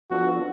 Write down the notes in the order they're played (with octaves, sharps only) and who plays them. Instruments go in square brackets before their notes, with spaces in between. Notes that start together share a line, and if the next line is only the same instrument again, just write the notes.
[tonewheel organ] F3 B3 D4 F4 A4 [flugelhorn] F#4